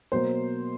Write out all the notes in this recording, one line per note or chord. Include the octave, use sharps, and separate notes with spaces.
B2 F#3 A#3 C5